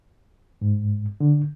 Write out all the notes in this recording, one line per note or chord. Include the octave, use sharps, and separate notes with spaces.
G#2
D3